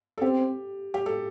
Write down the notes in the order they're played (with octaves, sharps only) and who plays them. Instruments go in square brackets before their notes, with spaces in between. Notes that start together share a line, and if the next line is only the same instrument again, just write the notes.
[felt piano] A4
[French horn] C4 [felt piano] G4
[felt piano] G4
A4